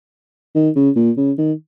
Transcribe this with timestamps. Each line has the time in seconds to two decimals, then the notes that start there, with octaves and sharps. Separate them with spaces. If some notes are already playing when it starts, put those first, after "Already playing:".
0.55 D#3
0.76 C#3
0.96 A#2
1.17 C#3
1.38 D#3